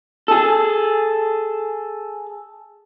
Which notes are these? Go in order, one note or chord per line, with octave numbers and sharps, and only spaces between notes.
G#4 A4